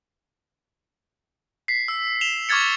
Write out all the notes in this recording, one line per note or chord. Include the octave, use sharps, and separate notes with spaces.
B6 C7
E6
E7 F7 G7
C#6 D6 F6 G#6 A6 C#7